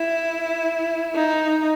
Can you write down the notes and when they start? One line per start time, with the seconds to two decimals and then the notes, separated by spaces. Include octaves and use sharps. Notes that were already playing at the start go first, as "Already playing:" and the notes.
Already playing: E4
1.15 D#4